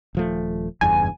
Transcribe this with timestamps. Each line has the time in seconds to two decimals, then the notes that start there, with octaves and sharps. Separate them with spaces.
0.15 D#1 F3 A3
0.81 F#1 E2 G2 G#5